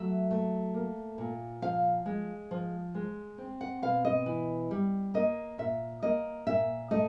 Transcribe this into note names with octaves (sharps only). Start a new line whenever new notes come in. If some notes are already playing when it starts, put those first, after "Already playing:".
Already playing: F#3 A3 E5
A3
A#3
A#2
F3 F5
G#3
F3
G#3
C4
F#5
B2 F5
D#5
E3
G3
A#3 D#5
A#2 E5
A#3 D#5
A#2 E5
A3 D#5